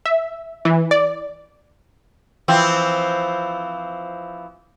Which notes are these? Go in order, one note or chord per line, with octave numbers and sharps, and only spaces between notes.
E5
E3
D5
E3 F3 C4